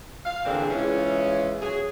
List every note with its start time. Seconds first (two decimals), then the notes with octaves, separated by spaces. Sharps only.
0.26 F5
0.45 A#2 D3 E3 C4 D4 G#4
0.70 C#3 E3 G#3 C#4 E4 F4
1.61 F#3 G#4